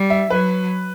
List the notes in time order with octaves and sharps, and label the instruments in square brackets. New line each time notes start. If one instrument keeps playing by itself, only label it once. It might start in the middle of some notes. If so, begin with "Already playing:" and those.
Already playing: [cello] G3
[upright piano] E5
[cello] F#3 [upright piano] B4